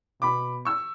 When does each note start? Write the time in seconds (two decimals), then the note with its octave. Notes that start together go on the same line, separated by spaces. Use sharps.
0.22 B2 B5 D6
0.65 C#6 E6